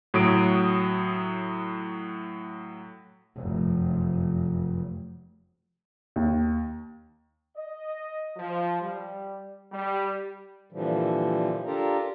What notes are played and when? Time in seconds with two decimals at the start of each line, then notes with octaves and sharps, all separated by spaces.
0.14 A2 F#3 D#6 D7
3.37 F1 F#2
6.16 D#2
7.56 D#5
8.37 F3
8.81 G3
9.72 G3
10.72 A#2 D3 E3 F3 G3
11.66 D4 F4 G4 A4 A#4 A#5